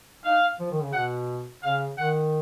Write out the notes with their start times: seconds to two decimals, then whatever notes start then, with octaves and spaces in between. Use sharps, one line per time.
0.24 D#4 F5
0.59 F3
0.71 D#3
0.82 C#3
0.93 B2 F#5
1.63 C#3 F5
1.98 D#3 F#5